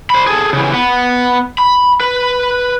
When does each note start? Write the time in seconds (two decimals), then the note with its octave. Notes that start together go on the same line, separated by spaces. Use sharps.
0.10 C5 B5
0.27 G#4 A4
0.53 C#3 E3
0.73 B3
1.58 B5
2.00 B4